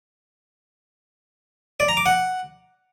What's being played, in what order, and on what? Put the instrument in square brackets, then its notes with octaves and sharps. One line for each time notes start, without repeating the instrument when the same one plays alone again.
[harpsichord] D5
A#5
D6
F#5